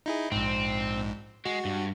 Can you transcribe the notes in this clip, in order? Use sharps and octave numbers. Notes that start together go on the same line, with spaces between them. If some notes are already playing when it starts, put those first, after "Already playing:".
D#4 E4 G#4
A#1 G#2 C4
G#3 F#4
G2